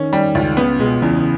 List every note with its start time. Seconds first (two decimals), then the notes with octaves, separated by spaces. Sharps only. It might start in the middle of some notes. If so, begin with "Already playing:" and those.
Already playing: D#3 C#4
0.13 G3
0.35 C#2
0.57 C#3 B3
0.79 B2 G#3
1.02 E2 C#3